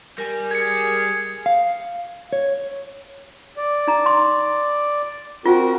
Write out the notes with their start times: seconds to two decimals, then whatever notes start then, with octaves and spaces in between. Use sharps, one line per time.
0.18 G3 A#4 G#5
0.51 G#4 G#6 C#7
1.46 F5
2.33 C#5
3.57 D5
3.87 D#4 A#5
4.06 C6
5.46 C4 F4 F#4 A#4